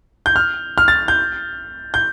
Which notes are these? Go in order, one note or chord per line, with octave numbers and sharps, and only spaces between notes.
G6
F6
F6
A6
G6
G6